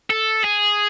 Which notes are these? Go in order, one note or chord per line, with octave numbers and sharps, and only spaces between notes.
A4
G#4